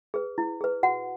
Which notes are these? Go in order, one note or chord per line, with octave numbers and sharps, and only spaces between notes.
G#4 B4
E4
G#4 B4
F#4 F#5